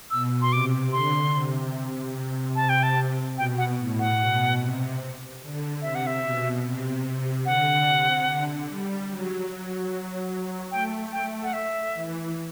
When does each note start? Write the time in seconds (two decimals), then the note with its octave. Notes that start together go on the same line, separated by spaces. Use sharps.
0.11 B2 E6
0.42 C6
0.52 C3 D6
0.92 D3 C6
1.34 C3
2.56 A5
2.69 G5
2.83 A5
3.37 B2 G5
3.58 F#5
3.78 A2
3.99 F#5
4.20 B2
4.59 C3
5.42 D3
5.82 C3 E5
5.95 F#5
6.07 E5
6.23 B2
6.64 C3
7.05 C3
7.45 D3 F#5
7.87 C3
8.27 D3
8.68 G3
9.08 F#3
9.50 F#3
10.71 A3 G5
11.12 G5
11.43 F#5
11.53 E5
11.94 E3